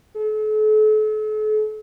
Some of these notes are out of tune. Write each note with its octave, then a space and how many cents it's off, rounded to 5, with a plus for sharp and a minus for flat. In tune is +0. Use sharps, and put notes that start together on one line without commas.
A4 -40